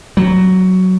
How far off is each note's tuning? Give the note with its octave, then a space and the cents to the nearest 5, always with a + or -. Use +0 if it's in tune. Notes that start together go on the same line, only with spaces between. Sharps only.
F#3 +5